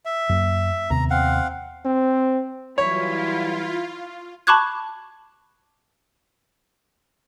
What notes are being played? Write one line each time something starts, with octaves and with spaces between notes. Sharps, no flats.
E5
F#2 A#3
D#2 C3 B3 A#5
C4 F5 F#5
C4
E3 F#3 G3 E4 F4 C#5
A5 B5 C#6 D6 F#6 G#6